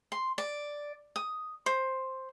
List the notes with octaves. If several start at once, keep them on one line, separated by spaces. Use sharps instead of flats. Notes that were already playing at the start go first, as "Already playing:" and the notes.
C6
D5
D#6
C5